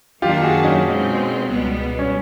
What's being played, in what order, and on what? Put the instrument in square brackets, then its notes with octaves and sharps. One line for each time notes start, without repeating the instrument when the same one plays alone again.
[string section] F#2 D#3 F#3 A#3 D4 [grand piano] F4 G4
[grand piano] F#4 G#4
C#4 D#4
[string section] B2 G#3 C4
C#2 B2 G3 B3
[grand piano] C#4